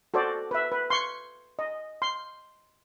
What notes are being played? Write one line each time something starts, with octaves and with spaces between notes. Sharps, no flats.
F#4 A4 C5 D5
B4 E5
B4
C6 C#6
D#5
C6